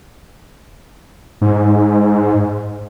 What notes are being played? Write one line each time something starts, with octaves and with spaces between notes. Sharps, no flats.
G#2